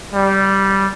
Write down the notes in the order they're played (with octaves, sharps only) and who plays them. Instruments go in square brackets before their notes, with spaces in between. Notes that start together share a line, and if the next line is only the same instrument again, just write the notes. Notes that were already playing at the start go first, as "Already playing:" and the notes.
[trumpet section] G3